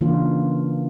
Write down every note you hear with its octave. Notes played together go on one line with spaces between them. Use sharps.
C#3 E3 A#3 D4 F4